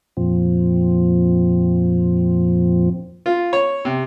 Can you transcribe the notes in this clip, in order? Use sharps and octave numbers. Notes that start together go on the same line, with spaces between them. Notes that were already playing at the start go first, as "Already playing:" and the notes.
F2 A#2 F3 C4
F4
C#5
C3